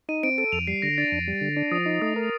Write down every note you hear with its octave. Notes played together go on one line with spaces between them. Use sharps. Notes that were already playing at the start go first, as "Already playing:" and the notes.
D#4 D#7
C4 D7
A4 D7
F2 F7
G3 C7
D3 A#6
D4 A6
F2
G3
D3
D4
F3 D#6
D#4
A3 D#6
A#4